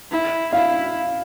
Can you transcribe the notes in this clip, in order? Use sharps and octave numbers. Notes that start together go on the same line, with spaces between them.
E4
E4 F5